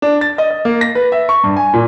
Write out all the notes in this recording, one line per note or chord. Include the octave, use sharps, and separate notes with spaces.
D4
A6
D#5
D#5
A#3
A#6
B4
E5
C#6
G2
G#5
A#2